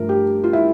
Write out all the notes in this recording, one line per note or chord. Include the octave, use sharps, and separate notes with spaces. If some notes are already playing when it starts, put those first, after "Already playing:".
Already playing: G2 F3 A3 A#4
G4
F4
E4